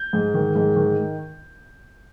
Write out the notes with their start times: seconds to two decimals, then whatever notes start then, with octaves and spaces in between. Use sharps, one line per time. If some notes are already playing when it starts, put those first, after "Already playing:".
Already playing: G6
0.13 G#2
0.34 D#3
0.55 G#2
0.76 D#3